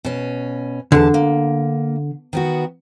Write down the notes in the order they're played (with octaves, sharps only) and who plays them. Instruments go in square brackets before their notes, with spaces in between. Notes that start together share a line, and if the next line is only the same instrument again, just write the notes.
[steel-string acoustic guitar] B2 C#4
[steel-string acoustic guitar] E2 A5 [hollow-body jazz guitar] D3
[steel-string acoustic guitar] A#3
D#3 B3 F#4